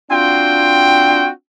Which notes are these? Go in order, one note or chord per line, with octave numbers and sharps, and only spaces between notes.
C4 D4 F4 F#4 G5